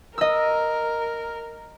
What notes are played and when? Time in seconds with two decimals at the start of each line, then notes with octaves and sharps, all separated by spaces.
0.18 A#4 D#5 E6